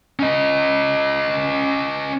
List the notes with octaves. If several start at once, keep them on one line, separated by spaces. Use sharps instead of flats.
C#4 D#5